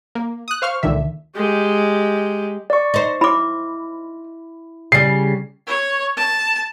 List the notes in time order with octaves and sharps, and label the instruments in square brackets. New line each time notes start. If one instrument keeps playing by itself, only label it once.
[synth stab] A#3
D#6 F#6
C5 F5 C#6 F6
C#2 A#2 D3 D#3 E5
[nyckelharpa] G#3 G4
[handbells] D5 C#6
[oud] D#4 C5
[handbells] E4 [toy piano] B5 D6
[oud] C#3 G3 [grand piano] C7
[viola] C#5
A5